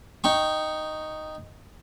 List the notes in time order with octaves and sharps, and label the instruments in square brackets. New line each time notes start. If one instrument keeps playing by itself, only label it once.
[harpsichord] D#4 G5 C#6